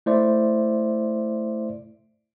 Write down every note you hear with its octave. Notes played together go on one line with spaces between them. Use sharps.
A3 E4 C5 D5 E5